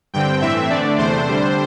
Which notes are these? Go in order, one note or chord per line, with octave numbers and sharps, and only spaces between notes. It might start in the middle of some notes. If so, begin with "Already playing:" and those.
G2 D3 C4 G5
A2 E3 C4 E5
D3 A3 D4 D5
E2 C3 A3 D4 C5
D3 G3 D4